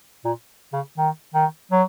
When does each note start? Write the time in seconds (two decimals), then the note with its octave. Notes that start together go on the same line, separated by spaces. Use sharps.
0.25 A#2
0.73 C#3
0.98 D#3
1.34 D#3
1.71 F#3